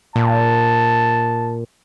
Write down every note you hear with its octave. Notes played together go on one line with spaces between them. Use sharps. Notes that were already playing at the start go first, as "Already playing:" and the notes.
A#2 A5